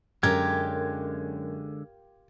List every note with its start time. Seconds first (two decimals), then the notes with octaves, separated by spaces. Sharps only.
0.23 F#2 D3 G#3 F4 G4 A#4 G#6